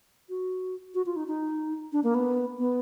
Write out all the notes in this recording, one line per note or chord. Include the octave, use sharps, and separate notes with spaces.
F#4
F#4
F4
D#4
D#4
D4
A#3
B3
B3